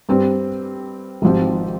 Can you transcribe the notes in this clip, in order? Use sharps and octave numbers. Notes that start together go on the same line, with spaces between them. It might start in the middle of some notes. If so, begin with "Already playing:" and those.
G2 G3 C4 G4
G#1 G#2 F3 C4 G4